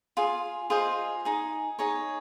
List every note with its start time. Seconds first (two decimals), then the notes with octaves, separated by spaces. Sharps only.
0.17 F4 G#4
0.70 F4 G#4 C5 D#5
1.25 D#4 G#4
1.79 D#4 G#4 C#5